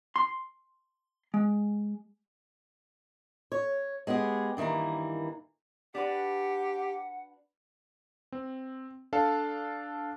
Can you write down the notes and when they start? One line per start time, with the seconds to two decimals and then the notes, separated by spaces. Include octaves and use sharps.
0.16 C6
1.34 G#3
3.52 C#5
4.07 G#3 B3 G4 G#4
4.57 G2 D#3 E3 A#3 A#5
5.95 D4 F#4 G4 B4 F#5
8.32 C4
9.13 D4 A4 F5 A5